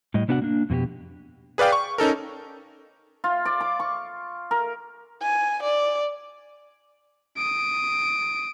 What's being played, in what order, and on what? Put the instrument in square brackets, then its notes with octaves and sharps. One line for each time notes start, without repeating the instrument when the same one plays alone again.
[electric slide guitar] A2 G3 D#5
C3 B3 D4 F#4 A#4 F#5
A#3 D4
F2 B2 F4 G4
[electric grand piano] G#4 B4 D5 F5 G5
C#6
C#4 D#4 A4 A#4
[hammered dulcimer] F4
D5
D6
C#6
A#4
[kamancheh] G#5
D5
[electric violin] D#6 D7